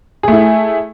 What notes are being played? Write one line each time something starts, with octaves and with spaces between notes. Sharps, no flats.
A3 E4 G#4